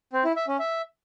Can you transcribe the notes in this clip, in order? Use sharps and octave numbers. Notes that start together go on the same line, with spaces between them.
C4
E4
E5
C#4
E5